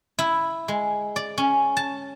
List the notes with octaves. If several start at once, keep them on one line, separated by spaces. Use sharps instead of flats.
E4
G#3
D5
C#4
A5